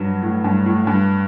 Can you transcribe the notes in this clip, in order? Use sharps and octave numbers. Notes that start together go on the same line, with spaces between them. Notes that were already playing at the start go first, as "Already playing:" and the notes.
Already playing: G2 F#3
A2
G2
A2
G2